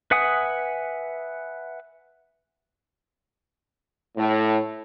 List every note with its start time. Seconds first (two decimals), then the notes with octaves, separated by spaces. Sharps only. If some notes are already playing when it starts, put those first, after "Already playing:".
0.11 B4 E5 F#5 G#5 D#6
4.17 A2